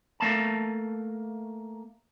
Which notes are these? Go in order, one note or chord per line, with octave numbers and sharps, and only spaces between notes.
A3 A#3 A5